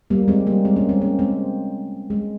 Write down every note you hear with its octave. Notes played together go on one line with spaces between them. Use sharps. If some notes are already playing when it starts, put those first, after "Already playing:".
G3 A#3
G#3 C4
G3 A#3
G#3 C4
A#3 C#4
G#3 C4
A#3 C#4
G#3 C4
G#3